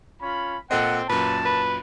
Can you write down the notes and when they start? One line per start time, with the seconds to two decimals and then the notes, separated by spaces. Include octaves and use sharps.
0.21 C#4 F4 B5
0.71 A#2 C4 A4 D#5 F#5
1.09 F#2 A#2 B4 A5
1.45 B4